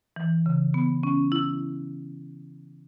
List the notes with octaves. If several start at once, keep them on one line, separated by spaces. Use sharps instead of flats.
E3
C#3
B3
C#4
E4